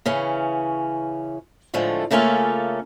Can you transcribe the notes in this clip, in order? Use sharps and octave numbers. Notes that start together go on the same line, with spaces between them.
C#3 E3 C#4
A2 D3 F3 G#3 A3
C#3 A3 A#3 C#4 F4 A4